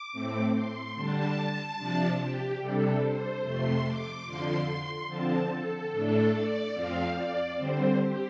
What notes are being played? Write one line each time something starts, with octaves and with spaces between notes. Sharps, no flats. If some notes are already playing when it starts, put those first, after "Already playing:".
Already playing: D6
A2 A3 C4
C6
D3 G3 D4 A5
C3 F3 D4
G4
C3 G3 D4 A4
C5
F2 C3 A3 C6
D6
F2 D3 F3 C6
C6
D3 F3 C4 A5
A4
A2 A3 D4 A4
D5
F2 F3 C4 F5
D5
D3 G3 C4 C5
G4